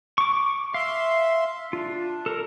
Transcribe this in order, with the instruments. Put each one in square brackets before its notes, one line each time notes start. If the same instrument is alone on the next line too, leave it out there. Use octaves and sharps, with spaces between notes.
[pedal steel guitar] C#6 D6
[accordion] E5 C6 [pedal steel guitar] F5
[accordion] D4 [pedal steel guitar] F4
[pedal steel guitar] A4 A#4